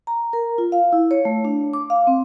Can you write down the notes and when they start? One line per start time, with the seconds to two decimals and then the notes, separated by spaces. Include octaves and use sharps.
0.07 A#5
0.33 A#4
0.58 F4
0.72 F5
0.93 E4
1.11 C#5
1.25 A3
1.45 D4
1.73 D6
1.90 F5
2.07 C4